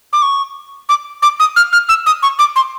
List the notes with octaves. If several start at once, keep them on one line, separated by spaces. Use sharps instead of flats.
D6
C#6
D6
D6
D#6
F6
F6
E6
D#6
C#6
D6
C6